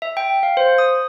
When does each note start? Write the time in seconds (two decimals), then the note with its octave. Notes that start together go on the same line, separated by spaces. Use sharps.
0.02 E5
0.17 G5
0.43 F5
0.57 C5
0.78 D#6